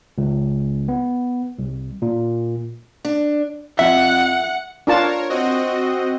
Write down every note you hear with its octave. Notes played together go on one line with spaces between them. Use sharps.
C#2
B3
C2
A#2
D4
F2 E5 F#5
D4 F4 A#4 C#5 A5
C4 F#4 D#5